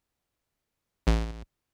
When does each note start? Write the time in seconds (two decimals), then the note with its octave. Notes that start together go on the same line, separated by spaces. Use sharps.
1.07 A1